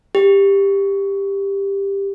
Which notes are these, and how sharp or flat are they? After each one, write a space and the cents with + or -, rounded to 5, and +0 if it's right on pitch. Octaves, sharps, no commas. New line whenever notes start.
G4 +15